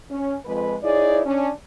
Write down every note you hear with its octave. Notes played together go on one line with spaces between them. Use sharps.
C#4
F2 G#3 B4
D#4 E4 G#4 C#5 D5
C#4 D4